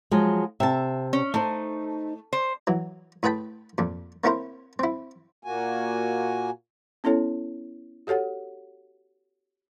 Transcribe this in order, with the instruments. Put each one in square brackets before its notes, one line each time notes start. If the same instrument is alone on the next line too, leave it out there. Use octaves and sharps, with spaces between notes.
[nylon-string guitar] F3 F#3 G#3
[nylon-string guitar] C3 A5 [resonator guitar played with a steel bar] E5
[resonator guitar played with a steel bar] C#4
[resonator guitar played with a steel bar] A3 [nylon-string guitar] D#4 C5
[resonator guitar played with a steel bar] C5
[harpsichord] E3 F#3
A2 G#4 B4 G5 A5 B5
F2 A#2
A#3 C4 C#4 E4 A#4 C5
C4 E4
[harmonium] A#2 A#3 F#4 G#5
[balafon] B3 C#4 E4 A4 C#5
F#4 G4 A4 C#5 F#5